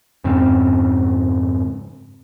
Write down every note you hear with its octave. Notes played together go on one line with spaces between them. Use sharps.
F2 G#2 C#3 C4